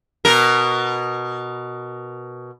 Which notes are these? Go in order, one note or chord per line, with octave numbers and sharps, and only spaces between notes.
B2 A#4